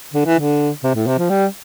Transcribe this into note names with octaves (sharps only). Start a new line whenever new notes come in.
D3
E3
D3
C3
A2
C3
F3
G3